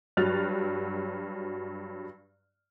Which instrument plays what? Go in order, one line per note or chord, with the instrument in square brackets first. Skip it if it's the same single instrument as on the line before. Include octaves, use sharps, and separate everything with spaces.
[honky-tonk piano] G2 F#3 F6 F#6 A6 F7